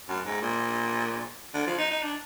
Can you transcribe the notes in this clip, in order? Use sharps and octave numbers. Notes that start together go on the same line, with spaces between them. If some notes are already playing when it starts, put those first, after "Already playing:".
F#2
G#2
A#2
D3
F3
D#4
D#4
D4